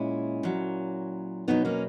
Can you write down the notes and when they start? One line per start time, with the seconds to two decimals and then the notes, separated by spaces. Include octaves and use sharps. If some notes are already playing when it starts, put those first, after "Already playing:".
Already playing: A#2 G#3 C#4 E4
0.43 A#2 F#3
1.48 E2 B2 F#3 B3 D#4
1.65 A#3 C#4